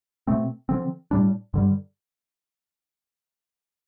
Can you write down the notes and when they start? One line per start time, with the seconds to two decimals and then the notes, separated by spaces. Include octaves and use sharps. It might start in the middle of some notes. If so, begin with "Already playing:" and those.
0.27 B2 A3 C4
0.69 D3 F3 C4
1.11 A2 G3 D4
1.54 G2 D3 G3